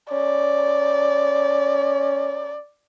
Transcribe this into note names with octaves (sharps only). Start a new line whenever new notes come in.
C#4 D5